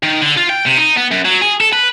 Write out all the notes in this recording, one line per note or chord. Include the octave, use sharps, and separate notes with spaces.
D#3
D3
F4
G5
C3
D#4
B3
F#2
F#3
G#4
A4
B4